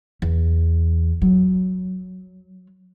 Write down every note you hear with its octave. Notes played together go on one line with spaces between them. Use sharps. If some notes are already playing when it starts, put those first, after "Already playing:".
E2
F#3